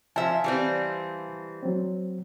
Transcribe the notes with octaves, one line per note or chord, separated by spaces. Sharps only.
F3 E5 F5 G#5 A5
E3 G3 C4
F#3 C4